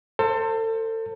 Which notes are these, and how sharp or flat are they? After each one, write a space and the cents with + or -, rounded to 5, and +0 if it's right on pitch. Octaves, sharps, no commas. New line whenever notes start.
A4 +30 C5 +5